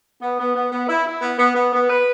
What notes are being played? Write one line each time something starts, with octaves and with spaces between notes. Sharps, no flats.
B3
B3
B3
B3
E4
E4
B3
B3
B3
B3
B4